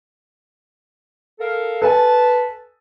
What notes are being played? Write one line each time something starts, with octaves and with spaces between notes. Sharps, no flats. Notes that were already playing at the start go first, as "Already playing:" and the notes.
A4 A#4 F5
A4 B4 G#5 A5